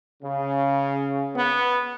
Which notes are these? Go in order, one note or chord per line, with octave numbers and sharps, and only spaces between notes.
C#3
B3